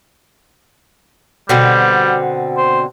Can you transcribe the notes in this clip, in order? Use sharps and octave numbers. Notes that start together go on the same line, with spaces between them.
B2 D3 G3 C4
C5